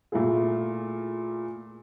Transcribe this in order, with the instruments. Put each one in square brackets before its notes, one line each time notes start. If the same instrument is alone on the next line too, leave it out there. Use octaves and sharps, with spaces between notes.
[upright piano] A#2 A3 E4 F4 G#4